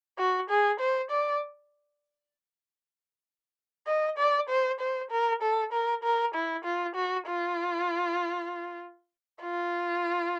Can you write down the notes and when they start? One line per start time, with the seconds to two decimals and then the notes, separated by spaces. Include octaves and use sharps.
0.18 F#4
0.50 G#4
0.80 C5
1.11 D5
3.88 D#5
4.18 D5
4.50 C5
4.80 C5
5.11 A#4
5.42 A4
5.73 A#4
6.04 A#4
6.35 E4
6.65 F4
6.95 F#4
7.27 F4
9.42 F4